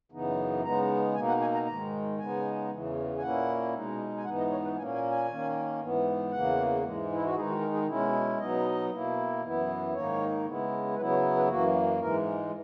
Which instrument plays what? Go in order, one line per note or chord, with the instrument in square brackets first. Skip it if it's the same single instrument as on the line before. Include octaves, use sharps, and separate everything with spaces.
[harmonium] F#2 C#3 E3 B3 D#4
C#3 G#3 B3 D#4 A#5
B2 A#3 D#4 G#5
F#5
G#5
A#5
G#2 D#3 G#3 A#5
C#3 G#3 B3 D#4 G#5
E2 C#3 E3
G#5
A#2 A#3 C#4 E4 F#5
B2 G#3 D#4
G#5
G#2 E3 B3 D#4 F#5
D#5
C#5
B4
A#2 A#3 C#4 G#5
G#5
G#5
D#3 A#3 C#4
G#2 E3 B3
E2 C#3 E3 A#3 F#5
G#2 E3 G#3
E4
F#4
D#3 G#3 D#4 G#4
F#4
A#4
G#4
B2 G#3 C#4 E4
F#4
G#4
B2 F#3 B3 D#4 D#5
B2 A#3 E4
F#2 E3 B3 E4
G#2 D#3 A#3 D#4 C#5
C#3 G#3 B3 E4
C#3 F#3 B3 E4 B4
C#5
B4
F#2 E3 A#3 F#4
G#2 E3 G#3 A#4